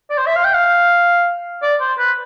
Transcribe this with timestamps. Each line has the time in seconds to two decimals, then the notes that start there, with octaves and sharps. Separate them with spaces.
0.10 D5
0.18 C5
0.26 E5
0.36 F5
0.44 G5
0.54 F5
1.62 D5
1.80 C5
1.98 B4